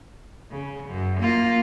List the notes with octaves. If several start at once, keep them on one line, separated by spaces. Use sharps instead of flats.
C#3
F#2
A#3 F4